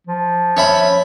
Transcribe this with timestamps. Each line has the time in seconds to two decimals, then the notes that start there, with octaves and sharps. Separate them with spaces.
0.07 F3
0.57 C#4 E5 B5